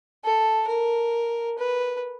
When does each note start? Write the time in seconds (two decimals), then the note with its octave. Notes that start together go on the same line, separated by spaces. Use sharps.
0.24 A4
0.68 A#4
1.59 B4